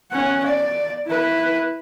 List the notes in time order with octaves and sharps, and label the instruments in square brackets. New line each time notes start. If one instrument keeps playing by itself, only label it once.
[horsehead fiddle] C#4 F#5
D5
E4 B4